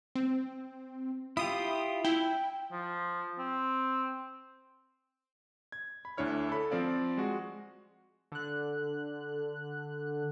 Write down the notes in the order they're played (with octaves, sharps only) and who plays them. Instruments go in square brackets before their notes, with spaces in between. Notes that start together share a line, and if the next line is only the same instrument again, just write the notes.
[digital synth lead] C4
[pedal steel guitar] E4 F4 G4 [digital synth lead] D#6
[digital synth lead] E4 [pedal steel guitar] G5
[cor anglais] F3
C4
[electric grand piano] G#6
B5
D2 D4 E4 C#5 F6
A4 B5
F3 C4 D5 F5
G#3 F#4
[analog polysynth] D3 F#6